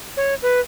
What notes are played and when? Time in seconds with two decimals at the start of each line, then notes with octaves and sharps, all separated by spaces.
0.17 C#5
0.42 B4